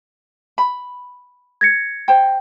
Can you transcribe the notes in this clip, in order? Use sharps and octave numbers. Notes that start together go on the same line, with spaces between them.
B5
G#6 A#6 C#7
C5 G5